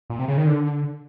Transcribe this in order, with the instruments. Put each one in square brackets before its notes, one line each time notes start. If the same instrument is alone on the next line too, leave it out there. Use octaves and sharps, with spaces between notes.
[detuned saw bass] A#2
C3
C#3
D#3
D3